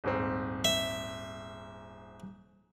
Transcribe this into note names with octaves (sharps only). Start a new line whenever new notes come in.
D#1 G#2 C4
E5